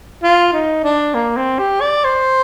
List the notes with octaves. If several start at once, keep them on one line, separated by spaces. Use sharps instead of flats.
F4
D#4
D4
A#3
C4
G4
D5
C5